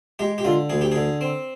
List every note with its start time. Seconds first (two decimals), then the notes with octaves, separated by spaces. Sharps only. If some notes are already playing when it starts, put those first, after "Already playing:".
0.19 G#3 G4
0.38 G4
0.45 D3 F4
0.70 D2 G#4
0.81 G4
0.92 D3 G#4
1.21 C4